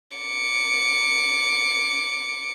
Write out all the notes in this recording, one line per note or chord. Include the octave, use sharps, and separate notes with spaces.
D6 C#7